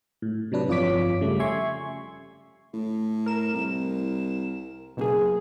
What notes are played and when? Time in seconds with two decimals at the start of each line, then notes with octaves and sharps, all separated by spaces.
0.22 A2
0.52 C3 F#3 D4 B4
0.68 G1 F2 F4 C#5 D6 B6
1.21 C#3 G3 A3
1.40 E5 G#5 C6 C#6 G#6
2.73 A2
3.26 A#4 E7
3.53 C2
4.97 F#1 B2 A#3 G#4